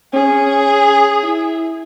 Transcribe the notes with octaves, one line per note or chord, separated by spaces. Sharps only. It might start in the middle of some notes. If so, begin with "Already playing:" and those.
C#4 G#4
E4